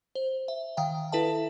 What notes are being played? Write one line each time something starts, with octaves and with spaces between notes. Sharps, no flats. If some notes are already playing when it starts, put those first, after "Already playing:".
C5
E5
D#3 F5 G5
E4 A4 B4 E5 A5